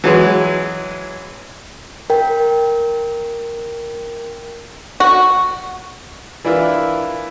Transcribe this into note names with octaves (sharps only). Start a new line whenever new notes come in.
E3 F#3 G#3
A#4 G5
F#4
E3 D4 E4 F4 A#4